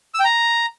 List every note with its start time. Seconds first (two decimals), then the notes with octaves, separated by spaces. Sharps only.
0.14 E6
0.19 G5
0.24 A#5